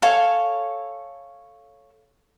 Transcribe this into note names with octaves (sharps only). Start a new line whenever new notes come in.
A4 C#5 F5 G#5